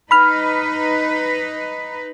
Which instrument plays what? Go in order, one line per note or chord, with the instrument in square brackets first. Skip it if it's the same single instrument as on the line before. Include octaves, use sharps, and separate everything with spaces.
[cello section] D#4 B4 [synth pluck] B5 F6